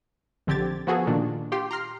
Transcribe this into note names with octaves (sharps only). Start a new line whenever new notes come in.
A#1 D3 C4 G4 G#6 A6
F3 B3 F#4 G#4 A4
A#2 D#3 D4
F4 G4 G5 C6
A#5 C6 F6 C7